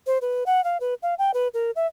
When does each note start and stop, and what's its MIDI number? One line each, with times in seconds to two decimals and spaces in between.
0.07 0.18 72
0.21 0.44 71
0.46 0.63 78
0.64 0.77 77
0.80 0.94 71
1.03 1.14 77
1.18 1.31 79
1.34 1.48 71
1.54 1.71 70
1.76 1.86 76